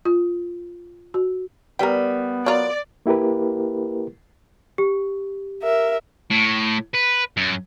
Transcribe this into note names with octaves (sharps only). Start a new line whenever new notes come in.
F4
F#4
G3 B3 A#4 B4 G5
F#3 F4 A#4 D5
A#3 E4 G4 A#4 B4
G4
A#4 E5
A2
B4
F#2